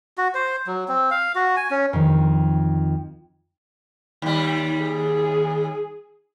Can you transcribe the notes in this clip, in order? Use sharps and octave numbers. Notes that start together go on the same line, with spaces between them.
F#4
C5
F#3
C4
F5
F#4
G#5
C#4
F2 D#3
D#2 G3
G#4